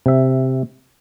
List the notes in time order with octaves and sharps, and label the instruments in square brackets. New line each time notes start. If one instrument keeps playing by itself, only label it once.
[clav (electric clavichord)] C3 E5